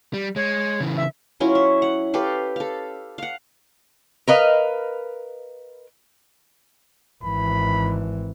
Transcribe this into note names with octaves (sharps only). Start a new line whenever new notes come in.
G3
G#3 C#5
C#3 E3
E5
F#3 C#4 E4 F4
E5
F#5
G4 A4 B4 F5
A4 F5
F5 F#5
A#4 B4 D#5 F5
G#1 E3 B5